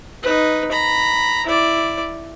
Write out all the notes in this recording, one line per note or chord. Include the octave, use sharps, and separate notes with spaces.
D#4 B4
A#5 B5
E4 D5